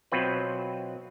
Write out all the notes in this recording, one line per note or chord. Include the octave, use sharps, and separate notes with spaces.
B2 F#3 C4 F4 B4